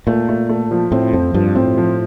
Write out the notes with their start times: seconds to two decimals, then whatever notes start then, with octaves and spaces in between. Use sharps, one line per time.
0.07 A#2 A3
0.29 A3
0.49 A3
0.71 F3
0.92 A2 C4
1.13 F2 F3
1.34 G2 F3
1.55 A2 C4
1.77 F3